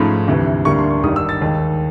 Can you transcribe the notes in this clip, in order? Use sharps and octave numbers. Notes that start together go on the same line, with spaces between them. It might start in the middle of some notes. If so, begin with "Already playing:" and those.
Already playing: G#2 F3 A3 C#4 B5
D2 C3 E3
D2 D3 G3 A#3 C#6
C6
C#6
G#1 G2 D#3 G3 D#6
E6
A6
D#2 D#3 G#3